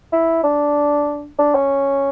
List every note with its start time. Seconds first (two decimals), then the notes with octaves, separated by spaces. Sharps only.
0.12 E4
0.44 D4
1.39 D4
1.55 C#4